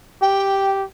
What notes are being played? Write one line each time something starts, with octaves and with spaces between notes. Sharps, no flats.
G4 G5